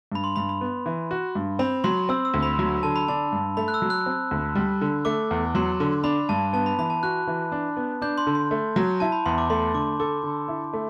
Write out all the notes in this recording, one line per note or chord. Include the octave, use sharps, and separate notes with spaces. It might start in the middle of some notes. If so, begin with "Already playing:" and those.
G2 B5
C6
G2 B5
B5
B3
E3
F#4
G2
C4 B5
F#3 C6
C4 E6
E6
D2
B5
F#3
D3 A5
B5
D4 A5
G2
A3 B5
F#6
E6
F#3
F#6
C4
D2
G3
D3
A3 D6
E2
F#3 C6
D3
D4 B5
G2 A5
B3 A5
B5
E3 B5
A5
F#4 F#6
E3
D4
B3
D4 G6
C6
D3
C6
A3
F#3
E4 A5
B5
E2 C6
D6
A3 C6
D3 D6
A4 D6
D3
E4
A3